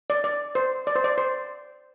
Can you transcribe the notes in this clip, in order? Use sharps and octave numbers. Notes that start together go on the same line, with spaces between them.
D5
D5
C5
D5
C5
D5
C5